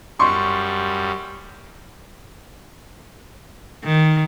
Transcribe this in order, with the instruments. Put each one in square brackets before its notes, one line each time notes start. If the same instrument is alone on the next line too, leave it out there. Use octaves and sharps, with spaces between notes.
[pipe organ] F#2 G3 [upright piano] C6 C#6
[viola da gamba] D#3